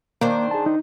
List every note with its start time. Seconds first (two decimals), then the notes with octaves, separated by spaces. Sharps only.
0.21 D#3 A#3 D4 C5
0.51 G#4 A5
0.66 D#4